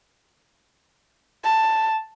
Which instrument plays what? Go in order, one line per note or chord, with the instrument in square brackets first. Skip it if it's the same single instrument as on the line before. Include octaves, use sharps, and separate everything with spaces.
[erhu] A5